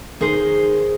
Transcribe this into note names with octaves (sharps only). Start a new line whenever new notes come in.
D#3 D#4 G#4 C5